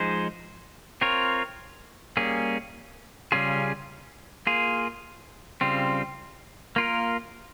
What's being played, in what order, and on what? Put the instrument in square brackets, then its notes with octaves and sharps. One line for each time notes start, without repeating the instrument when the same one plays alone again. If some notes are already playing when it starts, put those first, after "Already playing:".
Already playing: [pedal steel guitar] F3 G#3 D#4 G#4 C5
C4 F4 A#4 C#5
G3 A#3 C#4 G#4
C#3 G3 C#4 F4 G#4
A#3 F4 G#4
C#3 G3 C4 F4
A#3 F4 A#4